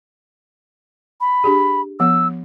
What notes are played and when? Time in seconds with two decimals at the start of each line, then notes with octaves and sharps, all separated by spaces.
1.21 B5
1.44 D4 G4 G#4
2.00 F3 B3 E6